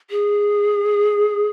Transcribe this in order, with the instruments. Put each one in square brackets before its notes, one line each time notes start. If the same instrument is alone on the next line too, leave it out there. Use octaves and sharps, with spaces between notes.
[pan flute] G#4